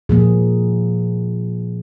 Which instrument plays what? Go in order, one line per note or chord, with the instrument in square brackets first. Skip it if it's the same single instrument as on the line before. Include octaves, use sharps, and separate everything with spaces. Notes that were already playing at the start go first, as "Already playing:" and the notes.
[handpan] A#2 F3 A#3 G#4